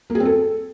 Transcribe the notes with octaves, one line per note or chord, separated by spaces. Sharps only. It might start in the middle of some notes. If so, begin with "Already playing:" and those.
A#3
G#4
C4
A4